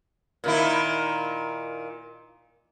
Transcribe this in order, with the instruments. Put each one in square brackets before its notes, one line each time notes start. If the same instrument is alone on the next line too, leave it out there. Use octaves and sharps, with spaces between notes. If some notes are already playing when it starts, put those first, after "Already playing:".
[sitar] A#2 D#3 E4